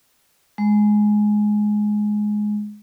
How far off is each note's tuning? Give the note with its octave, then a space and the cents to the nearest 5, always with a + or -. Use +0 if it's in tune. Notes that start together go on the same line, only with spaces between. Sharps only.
G#3 +10